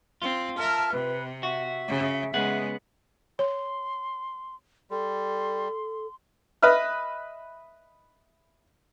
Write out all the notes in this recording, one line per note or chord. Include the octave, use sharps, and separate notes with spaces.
C4 F4
A#4 E5 A5 F6
C3 B4
F#4 E5
C#3
C#3 G#3 B3 G#4 F#5
C#5 C6
G3 A4 C6
B4 D#5 E5 F6